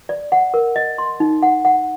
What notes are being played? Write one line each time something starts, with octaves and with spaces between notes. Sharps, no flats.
D5
F#5
A#4
D#5
C6
D#4
F#5
F#5